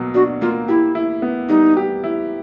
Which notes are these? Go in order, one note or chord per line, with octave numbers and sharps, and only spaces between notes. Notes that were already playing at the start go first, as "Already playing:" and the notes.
Already playing: B2 F#3 A#3
D4 F#4
A#3 F4
E4 G4
E4
B3
G3 D#4
G4
E4